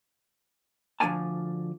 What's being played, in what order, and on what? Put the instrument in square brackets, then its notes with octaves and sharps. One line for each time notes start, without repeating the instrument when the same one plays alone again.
[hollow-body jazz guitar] D2 F3 C#4 D4 G#5 A5